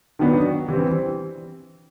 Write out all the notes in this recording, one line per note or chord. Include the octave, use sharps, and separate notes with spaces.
D#3 F#3 B3 D4 F#4
E3 G3 C4